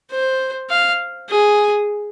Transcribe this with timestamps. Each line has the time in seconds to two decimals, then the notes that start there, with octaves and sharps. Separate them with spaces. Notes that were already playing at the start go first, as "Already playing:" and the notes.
0.11 C5
0.70 F5
1.29 G#4